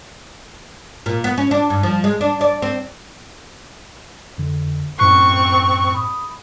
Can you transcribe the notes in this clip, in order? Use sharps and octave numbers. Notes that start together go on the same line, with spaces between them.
A#2
B3
C#4
D4
G2
F3
G#3
D4
D5
C4
F2 D3
F#2 A2 C4 C#6 F#6
B5 D#6